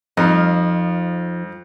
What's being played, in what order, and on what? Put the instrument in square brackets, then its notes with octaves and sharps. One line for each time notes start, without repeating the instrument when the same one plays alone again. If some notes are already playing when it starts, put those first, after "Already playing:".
[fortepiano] F2 [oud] F3 D#4